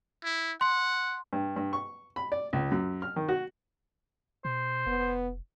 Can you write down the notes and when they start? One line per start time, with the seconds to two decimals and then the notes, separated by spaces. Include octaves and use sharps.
0.24 E4
0.61 F#5 C6
1.33 G2
1.56 G2
1.73 C#6
2.16 B5
2.32 D5
2.53 C#2
2.71 F#2
3.02 F6
3.16 D#3
3.29 F#4
4.45 B2 C5
4.86 F1 B3